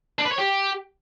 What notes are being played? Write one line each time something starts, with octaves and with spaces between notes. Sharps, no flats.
D4
B4
C#5
G4